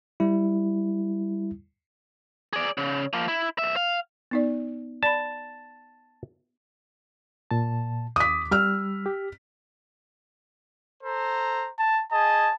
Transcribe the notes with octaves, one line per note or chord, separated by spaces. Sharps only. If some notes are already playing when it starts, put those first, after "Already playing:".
G3 E4
G#4 D5
C#3
F3 A#3
E4
B1 E5
F5
B3 D#4 D5
D5 A5 B5
A#2 A5
D#2 D6 D#6 B6
G3 E6 F6
G4
A4 C5 A#5
A5
G#4 D#5 G#5 A5